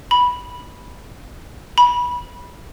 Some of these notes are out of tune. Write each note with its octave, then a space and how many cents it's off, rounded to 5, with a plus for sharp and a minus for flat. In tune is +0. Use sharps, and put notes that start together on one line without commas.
B5 -10
B5 -20